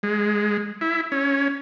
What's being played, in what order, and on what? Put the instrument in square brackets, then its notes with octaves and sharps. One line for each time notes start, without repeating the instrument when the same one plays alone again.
[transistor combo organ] G#3
E4
C#4